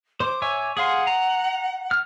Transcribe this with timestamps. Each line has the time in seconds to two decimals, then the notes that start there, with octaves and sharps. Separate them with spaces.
0.20 C5 D6
0.42 C#5 E5 G#5
0.77 G#4 F5 F#5 C6
1.07 A#5
1.91 F6